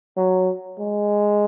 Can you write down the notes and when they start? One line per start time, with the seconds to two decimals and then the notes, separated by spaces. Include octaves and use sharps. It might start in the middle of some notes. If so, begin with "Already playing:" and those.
0.17 F#3
0.79 G#3